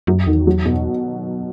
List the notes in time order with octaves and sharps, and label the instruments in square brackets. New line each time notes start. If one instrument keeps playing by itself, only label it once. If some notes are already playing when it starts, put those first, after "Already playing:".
[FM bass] F#2 [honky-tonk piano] F#3
[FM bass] E2 [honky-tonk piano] D#3
[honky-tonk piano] F#3
B2